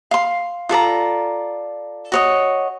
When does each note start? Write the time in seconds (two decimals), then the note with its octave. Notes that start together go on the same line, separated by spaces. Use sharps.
0.11 F5 C6
0.69 F4 A4 D5 A#5
2.12 F#4 C#5 D#5